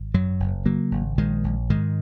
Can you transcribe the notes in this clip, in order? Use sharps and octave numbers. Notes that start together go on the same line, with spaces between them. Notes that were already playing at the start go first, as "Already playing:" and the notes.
Already playing: G#1
F#2 F#3
F#1
C#3 F#3 A#3
G#1
A#1 D#3 G#3
A#1
G#2 D#3 G#3